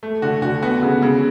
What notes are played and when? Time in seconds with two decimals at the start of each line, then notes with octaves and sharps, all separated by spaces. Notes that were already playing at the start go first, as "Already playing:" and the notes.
0.03 A3
0.22 D3 F#4
0.42 D3 F#4
0.62 B3 F#4
0.83 C#3
1.02 C#3